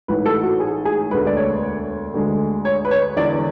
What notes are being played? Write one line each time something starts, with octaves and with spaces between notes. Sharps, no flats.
A1 G#2 E3 B4
A4
F#4
G#4
G#4
E1 D2 D3 B4
D5
C#5
D2 D3 G#3
C#5
B4
C#5
E1 E2 D3 D5